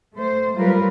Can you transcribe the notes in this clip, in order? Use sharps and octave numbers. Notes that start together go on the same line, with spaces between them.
A3 C5
F#3 G3 F4 A#4 B4